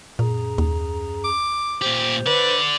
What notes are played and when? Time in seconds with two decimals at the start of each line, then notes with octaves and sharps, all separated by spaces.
0.19 F#2 A#2 G#4 A#5
0.58 D#2
1.24 D6
1.82 A#2 G4 C5
2.26 D3 B4 D5